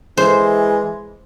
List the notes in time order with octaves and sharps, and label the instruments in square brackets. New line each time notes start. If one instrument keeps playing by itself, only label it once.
[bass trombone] E3 [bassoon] G#3 [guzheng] C5